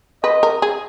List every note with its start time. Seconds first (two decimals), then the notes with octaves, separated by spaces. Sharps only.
0.23 B4 D#5
0.43 A#4
0.62 G#4